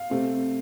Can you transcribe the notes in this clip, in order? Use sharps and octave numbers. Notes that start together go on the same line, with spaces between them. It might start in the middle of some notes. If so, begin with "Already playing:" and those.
Already playing: F5
C3 A3 C4